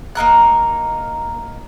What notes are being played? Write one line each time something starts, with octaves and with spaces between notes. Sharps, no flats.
A#3 D#4 A#4 F#6